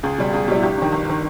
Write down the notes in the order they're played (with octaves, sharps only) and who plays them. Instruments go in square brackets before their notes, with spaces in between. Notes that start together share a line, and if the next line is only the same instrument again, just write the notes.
[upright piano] C#2 [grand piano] G#4
[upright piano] B2 G3
[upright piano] C#2 [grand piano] G#4
[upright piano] B2 [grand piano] G4
[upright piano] G3 [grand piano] E4
[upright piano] G1 [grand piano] G4
[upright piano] G2 D#3
G1
D#3